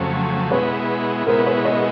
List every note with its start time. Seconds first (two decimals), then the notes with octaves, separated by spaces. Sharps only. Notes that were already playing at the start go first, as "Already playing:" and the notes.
Already playing: F2 C#3 F#3 A3 C5
0.51 B2 G#3 B3 E4 B4 C#5
1.27 B2 G#3 B3 E4 A#4 C5
1.46 B4 C#5
1.65 C#5 D#5